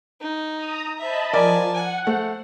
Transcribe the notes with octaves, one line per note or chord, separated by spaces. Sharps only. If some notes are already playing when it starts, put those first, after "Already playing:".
D#4
A#5 D#6
C5 D#5 E5 A5 B5
F3 A#4 D5 G#5 A5
F#5 G#5
A3 C5